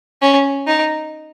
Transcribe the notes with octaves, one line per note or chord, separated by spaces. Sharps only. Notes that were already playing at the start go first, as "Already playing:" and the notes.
C#4
D#4